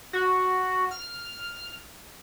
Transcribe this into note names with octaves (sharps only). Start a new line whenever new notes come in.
F#4
F6